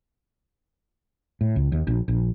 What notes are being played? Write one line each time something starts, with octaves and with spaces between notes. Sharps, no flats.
A2
C#2
D#2
A#1
A#1